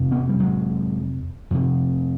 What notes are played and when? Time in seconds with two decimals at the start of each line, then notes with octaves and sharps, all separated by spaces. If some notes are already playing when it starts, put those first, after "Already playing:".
Already playing: F2 C3
0.11 B3 C#4
0.29 G3
0.40 F#3 G#3
1.51 F2 C3